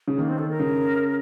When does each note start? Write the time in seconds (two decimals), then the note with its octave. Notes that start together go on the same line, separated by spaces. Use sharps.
0.08 C#3
0.18 D#3 A#3
0.28 C4
0.38 A4
0.50 A#4
0.60 C#3